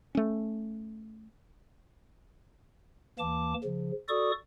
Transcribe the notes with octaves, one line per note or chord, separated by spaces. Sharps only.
A3 C#4
D#2 E3 A#3 A5 D6
C#3 F3
F#4 A4 D5 C#6 D#6